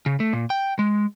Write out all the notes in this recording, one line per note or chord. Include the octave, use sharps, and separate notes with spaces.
C#3
A3
A#2
G5
G#3